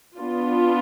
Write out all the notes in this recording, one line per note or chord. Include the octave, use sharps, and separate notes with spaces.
B3 D4 F4